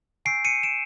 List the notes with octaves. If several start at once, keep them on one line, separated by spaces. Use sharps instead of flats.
G#5 C#6 E6 G6 C7 D7
C#7 D#7
D7 E7